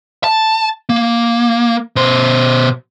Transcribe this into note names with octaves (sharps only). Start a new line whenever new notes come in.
A5
A#3
B2 C5